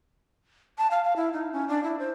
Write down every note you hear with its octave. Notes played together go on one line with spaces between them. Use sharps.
A5
F5
F5
E4
D#4
C#4
D4
E4
C5